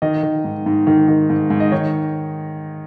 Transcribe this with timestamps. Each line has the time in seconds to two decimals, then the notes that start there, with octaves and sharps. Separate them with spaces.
0.02 D#3 D#5
0.23 D#3
0.44 G#2
0.66 G#2
0.87 D#3
1.08 D#3
1.30 G#2
1.50 G#2
1.60 D#5
1.72 D#3 C#5